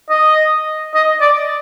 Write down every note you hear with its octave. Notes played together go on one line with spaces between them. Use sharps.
D#5
D#5
D5